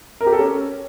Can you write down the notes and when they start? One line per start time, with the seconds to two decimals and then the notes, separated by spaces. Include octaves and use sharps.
0.21 A#4
0.27 G4
0.33 A4
0.39 C#4